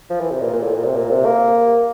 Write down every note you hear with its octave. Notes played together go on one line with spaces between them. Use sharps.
F3
E3
C3
A#2
A#2
A2
A#2
C3
A#2
C3
A#3